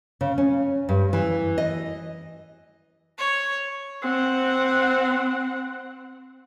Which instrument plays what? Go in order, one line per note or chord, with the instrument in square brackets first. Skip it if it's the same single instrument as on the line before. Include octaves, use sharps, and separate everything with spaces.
[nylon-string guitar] C#3
C#4
G2
E3
D#5
[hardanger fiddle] C#5
[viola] C4 F#5